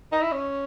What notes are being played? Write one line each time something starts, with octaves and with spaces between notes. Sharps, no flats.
D#4
E4
C#4